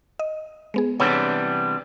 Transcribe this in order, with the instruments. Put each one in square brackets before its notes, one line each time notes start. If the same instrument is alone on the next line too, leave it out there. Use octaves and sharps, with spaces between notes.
[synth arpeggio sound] D#5
G#3 B3 G#4
[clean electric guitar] C3 E3 G3 [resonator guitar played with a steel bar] B3 D4 [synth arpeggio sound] C#5